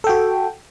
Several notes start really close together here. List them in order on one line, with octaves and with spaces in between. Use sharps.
A4 G5 F#4